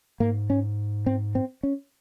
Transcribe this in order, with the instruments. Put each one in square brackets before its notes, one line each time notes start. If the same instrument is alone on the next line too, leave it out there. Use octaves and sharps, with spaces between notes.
[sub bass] G#2 [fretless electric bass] A#3
[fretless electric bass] C#4
C4
C4
C#4